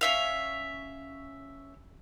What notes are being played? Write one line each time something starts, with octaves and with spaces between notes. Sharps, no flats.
C#4 E5 F5